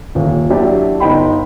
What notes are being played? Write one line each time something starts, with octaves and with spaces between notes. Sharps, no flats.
D#1
F#3 D4 E4 G4
G1 D#4 G5 B5 C6